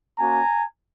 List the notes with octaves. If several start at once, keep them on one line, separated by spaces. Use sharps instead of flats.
A#3 C#4 F#4 G#5 A#5